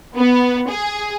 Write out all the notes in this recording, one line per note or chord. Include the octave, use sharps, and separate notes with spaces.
B3
G#4